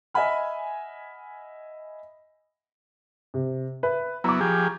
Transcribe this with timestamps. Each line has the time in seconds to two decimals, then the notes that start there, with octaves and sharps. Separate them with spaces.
0.14 D#5 E5 F#5 G#5 B5 F6
3.34 C3
3.83 B4 E5
4.24 F#3 B3 E4 A#5 C#6 D6
4.41 F3 G4 G#4